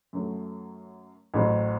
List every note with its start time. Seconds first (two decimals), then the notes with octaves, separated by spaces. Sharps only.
0.13 F#2 F#3 A3
1.34 A1 A2 F#3 C4